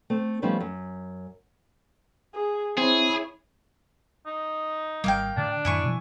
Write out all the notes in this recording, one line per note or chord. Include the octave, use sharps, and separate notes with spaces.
A3 C4
F3 G3 A3 B3 C#4 D#4
F#2
G#4
C4 E4 G#4 C#5
D#4
G#1 G3 A#3 F5 G5
A2 D3 D4
F#2 A2 D#3 E4 G#5 C#6
B2 E3 F3